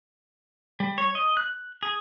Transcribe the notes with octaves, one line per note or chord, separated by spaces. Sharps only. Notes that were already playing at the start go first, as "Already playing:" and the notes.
G3
C#5
D#5
F#6
G#4